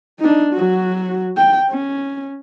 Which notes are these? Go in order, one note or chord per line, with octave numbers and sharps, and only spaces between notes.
D4 D#4
F#3 F#4
G5
C#4